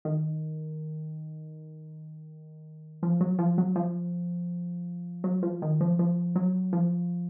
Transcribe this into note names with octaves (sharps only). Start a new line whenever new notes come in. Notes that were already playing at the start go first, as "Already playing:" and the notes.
D#3
F3
F#3
F3
F#3
F3
F#3
F3
D#3
F3
F3
F#3
F3